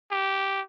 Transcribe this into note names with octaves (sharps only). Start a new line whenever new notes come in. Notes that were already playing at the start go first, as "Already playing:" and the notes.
G4